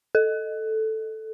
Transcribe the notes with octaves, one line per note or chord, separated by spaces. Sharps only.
A4